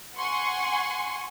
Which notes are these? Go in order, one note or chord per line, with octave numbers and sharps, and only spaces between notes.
F#5 G#5 C6 C#6